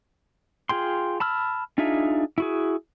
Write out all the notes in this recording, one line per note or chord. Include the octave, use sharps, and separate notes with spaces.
F4 G#4 G5 C6
A5 B5 E6 F6
D4 D#4 F4 G#4 E5
E4 F#4 G#4